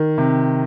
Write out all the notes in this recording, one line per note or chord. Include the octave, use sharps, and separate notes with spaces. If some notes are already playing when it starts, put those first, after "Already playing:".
Already playing: D#3
C3